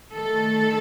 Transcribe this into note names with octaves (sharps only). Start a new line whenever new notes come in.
D#3 A3 A4